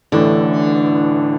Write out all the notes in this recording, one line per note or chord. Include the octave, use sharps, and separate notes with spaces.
A1 A2 D3 E3 A3 D4